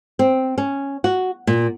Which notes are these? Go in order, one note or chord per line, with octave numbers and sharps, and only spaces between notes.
C4
C#4
F#4
A#2